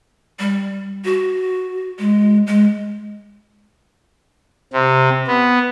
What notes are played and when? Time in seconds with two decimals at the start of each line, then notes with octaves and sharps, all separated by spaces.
0.39 G3
1.05 F#4
1.99 G#3
2.47 G#3
4.73 C3
5.27 B3